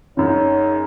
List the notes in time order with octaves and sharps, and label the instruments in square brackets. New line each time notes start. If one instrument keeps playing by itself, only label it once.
[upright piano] F#2 C#3 [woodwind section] D#4 C#5